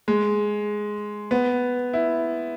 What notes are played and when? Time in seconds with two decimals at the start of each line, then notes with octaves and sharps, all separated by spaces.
0.08 G#3
1.31 B3
1.93 E4